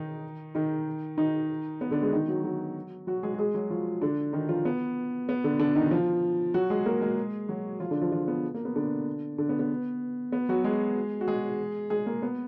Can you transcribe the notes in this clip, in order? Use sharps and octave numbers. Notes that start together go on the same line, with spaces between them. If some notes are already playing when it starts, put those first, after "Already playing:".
Already playing: D#3 D#4
D#3 D#4
D#3 D#4
B3
D3 D4
G#3 G#4
D#3 D#4
F#3 F#4
F#3 F#4
F#3 F#4
G#3 G#4
F#4
G#3 G#4
F#3 F#4
F3 F4
D3 D4
D#3 D#4
F3 F4
B3
B3
D3 D4
D3 D4
D#3 D#4
F3 F4
F#3 F#4
G#3 G#4
A#3 A#4
G#3 G#4
F#3 F#4
F3 F4
D3 D4
F3 F4
F3 F4
B3
A#3
B3
D3 D4
D3 D4
B3
B3
B3
F#3 F#4
G#3 G#4
F#4
G#3 G#4
G#3 G#4
A#3
B3